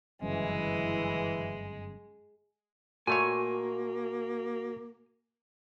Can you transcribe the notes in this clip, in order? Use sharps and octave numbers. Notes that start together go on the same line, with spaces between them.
G1 F#2 C#3 E3 G#3
A#2 A3 A#3 F#4 C#5 G#5